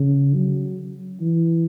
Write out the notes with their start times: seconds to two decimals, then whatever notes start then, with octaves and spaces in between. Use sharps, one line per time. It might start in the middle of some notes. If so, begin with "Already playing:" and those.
Already playing: C#3
0.34 F#3
1.21 E3